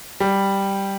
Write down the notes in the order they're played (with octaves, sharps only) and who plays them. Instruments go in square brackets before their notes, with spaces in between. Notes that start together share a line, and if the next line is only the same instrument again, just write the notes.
[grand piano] G3